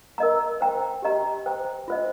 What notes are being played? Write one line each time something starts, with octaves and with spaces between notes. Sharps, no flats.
A#4 D#5 A#5
C5 G5 A#5
G4 D#5 A#5
C5 G5 A#5
F4 C5 D#5